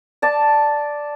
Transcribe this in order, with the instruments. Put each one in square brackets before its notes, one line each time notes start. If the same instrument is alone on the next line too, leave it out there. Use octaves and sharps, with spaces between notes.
[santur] D5 A5